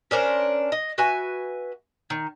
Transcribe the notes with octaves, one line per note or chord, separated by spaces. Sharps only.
C#4 D4 A#4 C5
D#5
F#4 B4 E5 G#5
D#3